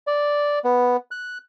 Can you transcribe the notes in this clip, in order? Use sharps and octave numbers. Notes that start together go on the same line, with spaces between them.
D5
B3
F#6